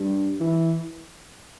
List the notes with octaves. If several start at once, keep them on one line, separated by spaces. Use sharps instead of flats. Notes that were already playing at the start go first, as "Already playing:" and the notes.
Already playing: G2
E3